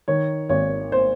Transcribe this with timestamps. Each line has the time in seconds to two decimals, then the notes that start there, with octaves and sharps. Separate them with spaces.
0.08 D#3 C#5
0.49 G#1 C#5
0.92 C5